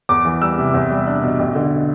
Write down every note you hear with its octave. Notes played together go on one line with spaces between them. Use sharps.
E2 D6
E3
G3 E6
C3
E2
G3
D4
B2
A1
D3